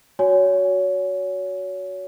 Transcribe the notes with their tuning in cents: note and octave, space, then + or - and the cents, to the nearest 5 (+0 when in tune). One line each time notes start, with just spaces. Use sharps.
F#4 +0 C#5 +25 G#5 +0